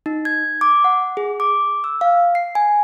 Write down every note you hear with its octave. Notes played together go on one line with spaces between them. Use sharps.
D#4
G#6
D6
F#5
G#4
D6
E6
F5
C7
G#5